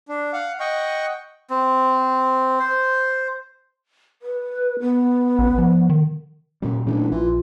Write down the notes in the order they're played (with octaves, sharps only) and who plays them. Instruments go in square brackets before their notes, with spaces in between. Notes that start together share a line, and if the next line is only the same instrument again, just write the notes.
[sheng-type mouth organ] D4
F5 F#5
D#5 F#5 G5 C#6
[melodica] C4
C5
[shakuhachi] B4
B3
[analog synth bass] A1
F3
D#3
[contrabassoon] F#2 [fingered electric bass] A#2 G3
[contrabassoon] F#1 [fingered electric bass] A#2 E3 A3 [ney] D4
[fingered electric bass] A#1 [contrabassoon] E3 [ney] F4